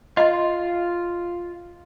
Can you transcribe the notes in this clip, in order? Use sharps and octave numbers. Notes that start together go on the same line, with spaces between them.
F4 D#5 C6